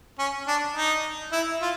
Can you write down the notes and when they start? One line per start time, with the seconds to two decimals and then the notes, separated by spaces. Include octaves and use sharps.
0.19 C#4
0.47 D4
0.76 D#4
1.32 E4
1.62 F4